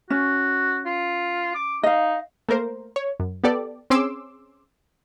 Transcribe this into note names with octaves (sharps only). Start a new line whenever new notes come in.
C#4 F#4
F4
D6
D#4 D#5 F5
A3 A#3 A#4 C5
C#5
F#2
B3 G4 A4 D5
C4 C#4 G#4 C6 D6 E6